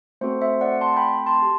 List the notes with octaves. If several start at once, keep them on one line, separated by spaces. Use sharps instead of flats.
A3 C4 F#4 A4 C5
C5 E5
D5 F#5
A5 C6
G5 B5
A5 C6
G4